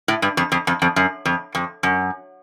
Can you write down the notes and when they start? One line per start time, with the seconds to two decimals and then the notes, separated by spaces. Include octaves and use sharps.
0.08 A2
0.22 G2
0.37 F2
0.52 F2
0.67 F2
0.82 F2
0.96 F#2
1.25 F2
1.55 F2
1.83 F#2